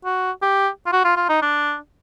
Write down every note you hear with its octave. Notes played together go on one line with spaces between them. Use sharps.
F#4
G4
F4
F#4
F4
F4
D#4
D4